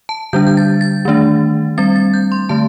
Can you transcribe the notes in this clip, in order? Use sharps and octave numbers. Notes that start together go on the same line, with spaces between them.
A5
D3 G3 D4 G6
G6
A6
A6
D#3 A3 D4
G3 C4 A6
A6
G6
C6
D3 A3 A5